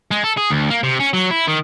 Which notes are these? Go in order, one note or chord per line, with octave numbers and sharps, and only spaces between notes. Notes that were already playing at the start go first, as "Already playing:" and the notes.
G#3
A4
G#4
D2
A#3
C3
C#4
F#3
E4
D#3